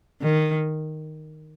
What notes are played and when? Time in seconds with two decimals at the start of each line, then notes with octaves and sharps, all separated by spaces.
0.22 D#3